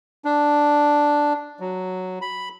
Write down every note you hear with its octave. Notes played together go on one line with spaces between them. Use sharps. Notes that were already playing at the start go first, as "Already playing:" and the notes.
D4
F#3
B5